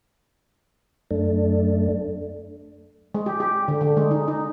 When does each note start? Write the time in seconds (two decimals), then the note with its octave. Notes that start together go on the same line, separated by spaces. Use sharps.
1.11 F#2 A3 D4
3.15 G#3
3.26 G4
3.40 G4
3.68 D3
3.81 D3
3.97 G#3
4.11 D#4
4.28 D#4